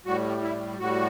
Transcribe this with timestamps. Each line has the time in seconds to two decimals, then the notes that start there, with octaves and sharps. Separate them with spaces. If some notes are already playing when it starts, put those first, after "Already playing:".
0.06 A2 G3 F#4
0.42 E4
0.79 A2 G3 F#4